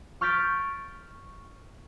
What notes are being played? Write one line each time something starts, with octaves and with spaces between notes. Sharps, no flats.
C#6 F6 G6 A6 B6 D7